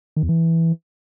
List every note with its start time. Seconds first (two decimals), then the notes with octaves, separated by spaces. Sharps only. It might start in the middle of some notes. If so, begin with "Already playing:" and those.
0.17 D#3
0.23 E2
0.29 E3